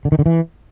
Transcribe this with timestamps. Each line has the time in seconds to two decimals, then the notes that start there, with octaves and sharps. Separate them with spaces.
0.05 D3
0.12 D#3
0.19 D3
0.26 E3